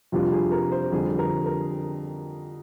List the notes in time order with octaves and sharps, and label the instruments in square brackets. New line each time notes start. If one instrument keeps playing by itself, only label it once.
[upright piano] F2 C3 G3 D4 F4
G#4
A#4
C5
F2 D3 G3 C4 G#4
A#4
A#4